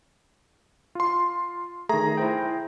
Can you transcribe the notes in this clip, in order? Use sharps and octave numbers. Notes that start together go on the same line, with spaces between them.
F4 C6
D#3 A3 G#4 A#5
E4 C5 G5